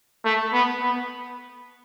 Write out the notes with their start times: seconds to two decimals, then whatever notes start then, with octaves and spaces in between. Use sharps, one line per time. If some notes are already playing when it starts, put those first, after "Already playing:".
0.25 A3
0.53 B3
0.82 B3